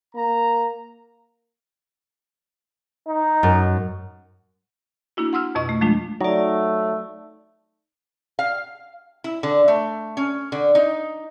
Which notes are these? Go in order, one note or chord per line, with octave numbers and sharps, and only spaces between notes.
A#3 A#5
D#4
F#2
A#3 D4 E4 F#4
F#5 C6 E6 F6
F2 B2 D#5 C#6
A3
F3 G#3 A3 D4 F4
F#3 A3 D#4 D5
F5
E4
D3
A3
C#4
D3
D#4